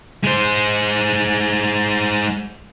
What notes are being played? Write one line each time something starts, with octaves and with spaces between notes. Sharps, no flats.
G#3 C5